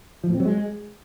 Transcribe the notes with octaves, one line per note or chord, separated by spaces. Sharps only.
F3
A2
C4
F#3
G#3